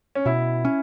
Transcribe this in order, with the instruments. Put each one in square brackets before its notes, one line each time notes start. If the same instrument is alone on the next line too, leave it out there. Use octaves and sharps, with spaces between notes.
[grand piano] C#4
[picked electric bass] B2 [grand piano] E4
[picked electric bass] C#4